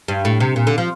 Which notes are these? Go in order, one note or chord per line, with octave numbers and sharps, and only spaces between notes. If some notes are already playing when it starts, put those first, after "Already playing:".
G2
A2
C3
A#2
D3
F3